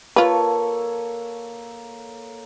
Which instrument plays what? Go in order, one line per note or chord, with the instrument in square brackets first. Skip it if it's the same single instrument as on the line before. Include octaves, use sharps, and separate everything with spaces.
[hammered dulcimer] A#3 A4 C#5 [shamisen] F4 B4